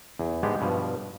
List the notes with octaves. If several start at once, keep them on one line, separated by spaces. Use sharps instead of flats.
E2
G#2 G#3 B3 D4 G4 G#4
G2 B2 F3